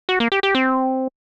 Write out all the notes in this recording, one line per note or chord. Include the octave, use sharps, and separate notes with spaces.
F#4
A#3
G4
G4
C4